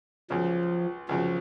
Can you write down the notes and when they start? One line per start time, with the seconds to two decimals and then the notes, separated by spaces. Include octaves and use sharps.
0.30 C#2 C#3 F3 F#3
1.09 C#2 C#3 F3 F#3